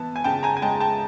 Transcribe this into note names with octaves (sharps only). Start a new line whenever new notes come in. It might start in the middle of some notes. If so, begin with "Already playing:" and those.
Already playing: E3 B3 A5
G#5
C#3 G5 A5
G#5 A#5
G#5
G#3 G5 A5
G5 A5